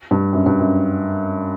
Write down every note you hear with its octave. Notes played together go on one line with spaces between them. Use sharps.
G2
F#2
G2
F#2